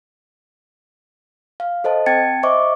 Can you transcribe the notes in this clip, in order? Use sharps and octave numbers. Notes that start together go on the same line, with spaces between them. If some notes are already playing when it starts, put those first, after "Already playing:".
F5
A4 C5 D#5 A5
C4 G5 A5 G#6 A6 C#7
C5 D#5 E5 C#6 D6